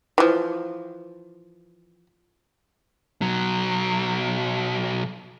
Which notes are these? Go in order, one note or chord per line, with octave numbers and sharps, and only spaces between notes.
E3 F3
B1 F#3